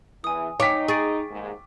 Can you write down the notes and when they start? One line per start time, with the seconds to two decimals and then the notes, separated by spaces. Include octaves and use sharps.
0.24 E2 E3 G#5 D#6
0.60 D#4 C#5 F5 G5 D6 B6
0.88 G#4 C#6 A6 D7
1.30 D#2 G#2